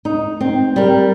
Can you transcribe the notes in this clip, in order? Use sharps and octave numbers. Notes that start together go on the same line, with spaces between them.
D#4
C4
G3 A#4